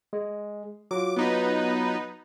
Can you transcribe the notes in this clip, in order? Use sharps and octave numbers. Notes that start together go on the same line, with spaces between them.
G#3
F#3 F4 D6
B3 D#4 B4